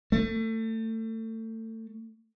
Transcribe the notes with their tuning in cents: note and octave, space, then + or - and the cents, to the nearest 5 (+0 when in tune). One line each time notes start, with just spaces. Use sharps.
A3 +25